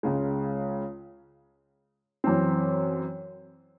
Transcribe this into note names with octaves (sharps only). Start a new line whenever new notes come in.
C#2 C#3 G#3
F#2 E3 C4